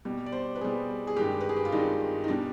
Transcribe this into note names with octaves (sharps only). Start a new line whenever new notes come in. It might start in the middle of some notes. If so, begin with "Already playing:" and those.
B2 G3
D5
C5
B4
B2 G3 G#4
G#4
G2 D#3 G#3 G4
B4
G#4
G4
F4
G2 D#3 G#3 D#4
D#4
B2 G3 D4